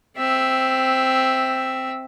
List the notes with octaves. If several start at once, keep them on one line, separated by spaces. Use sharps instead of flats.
C4 E5